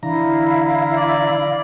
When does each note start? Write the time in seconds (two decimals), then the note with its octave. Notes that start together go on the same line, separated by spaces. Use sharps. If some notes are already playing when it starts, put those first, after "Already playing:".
0.03 D3 E3 E4 F5 A#5
0.96 D5